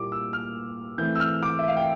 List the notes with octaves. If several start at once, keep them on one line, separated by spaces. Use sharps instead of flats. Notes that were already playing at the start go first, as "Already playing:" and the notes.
Already playing: A#2 G3 A#3 E4 D6
E6
F6
E3 A3 C4 E4 G6
E6
F6
D6
E5
F5
G5